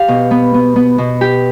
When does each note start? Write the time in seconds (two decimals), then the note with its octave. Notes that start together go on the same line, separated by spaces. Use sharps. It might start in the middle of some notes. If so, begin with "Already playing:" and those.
Already playing: G4 F5
0.08 B2
0.31 B3
0.54 B3
0.76 B3
0.98 B2
1.21 G4